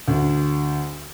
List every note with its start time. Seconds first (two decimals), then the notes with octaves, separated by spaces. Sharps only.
0.08 D2